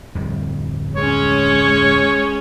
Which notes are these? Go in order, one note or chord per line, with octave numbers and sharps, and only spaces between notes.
D1 F2 G3
G#3 C#4 C#5